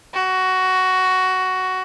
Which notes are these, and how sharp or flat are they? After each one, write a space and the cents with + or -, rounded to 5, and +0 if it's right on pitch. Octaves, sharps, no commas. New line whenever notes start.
F#4 +10